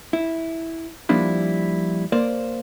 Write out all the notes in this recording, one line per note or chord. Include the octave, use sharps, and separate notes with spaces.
E4
F3 G3 A#3 D4 E4
A#3 C5 D5